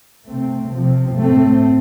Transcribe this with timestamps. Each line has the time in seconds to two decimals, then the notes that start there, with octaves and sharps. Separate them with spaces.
0.28 C3 A3 C4
0.73 C3 F3 C4
1.19 A2 A3 C4